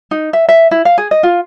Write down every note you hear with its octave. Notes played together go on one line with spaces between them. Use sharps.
D#4
E5
E5
E4
F5
G#4
D#5
F4